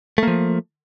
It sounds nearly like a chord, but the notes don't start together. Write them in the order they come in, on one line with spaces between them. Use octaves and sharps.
A3 A#3 F3